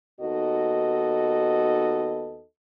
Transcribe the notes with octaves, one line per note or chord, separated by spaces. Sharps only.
D#2 B3 D#4 F#4 A4 D#5